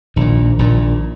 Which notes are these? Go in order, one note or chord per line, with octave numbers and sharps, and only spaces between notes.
A#1 A#2 D#3
A#1 A#2